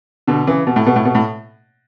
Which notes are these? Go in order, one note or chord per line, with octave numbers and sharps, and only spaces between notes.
B2 D3
C#3 E3
B2
A2
B2
A2
B2
A2